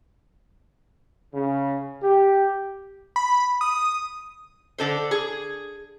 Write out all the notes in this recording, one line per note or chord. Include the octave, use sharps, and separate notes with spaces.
C#3
G4
B5
D#6
D3 A4 C5
G#4